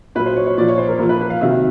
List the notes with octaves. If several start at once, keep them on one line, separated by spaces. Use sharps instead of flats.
A#2 F#3 B4
C5
C#5
C#5
A#2 F3 D5
C#5
C5
A#4
A#2 F3 A#4
B4
B4
F5
C3 D#3 F#3 E5